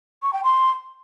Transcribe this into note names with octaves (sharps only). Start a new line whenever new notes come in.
C#6
G5
C6